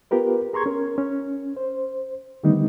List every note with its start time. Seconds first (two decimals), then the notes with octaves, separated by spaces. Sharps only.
0.11 B3 F4 G4 A#4 B4
0.53 G#4 A#5 C6 C#6 G#6
0.66 C#4 A#4
0.98 C#4
1.57 C5
2.43 D3 D#3 G3 A3 B3 D#4